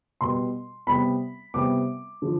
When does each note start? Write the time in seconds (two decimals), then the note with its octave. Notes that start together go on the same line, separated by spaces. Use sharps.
0.21 B2 G3 B3 C6
0.87 C3 G3 B3 B5
1.54 C3 G3 B3 D6
2.22 D3 F3